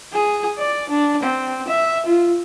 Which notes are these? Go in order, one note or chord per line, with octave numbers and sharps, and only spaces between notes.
G#4
D5
D4
C4
E5
F4